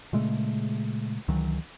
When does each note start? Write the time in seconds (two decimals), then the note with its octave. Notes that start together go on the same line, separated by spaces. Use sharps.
0.13 A#2 C#3 G#3 A3
1.28 C#2 D#3 E3 F#3